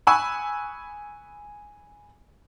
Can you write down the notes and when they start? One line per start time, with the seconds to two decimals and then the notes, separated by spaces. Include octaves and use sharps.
0.07 G#5 B5 C#6 D#6 E6 F#6